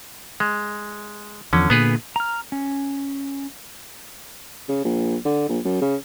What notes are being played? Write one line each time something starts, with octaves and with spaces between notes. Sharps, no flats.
G#3
E2 D3 F3 C#4
A#2 D3 B3 G#4 B4
A#5 F6
C#4
C#3
A#1
D3
A#1
F#2
C#3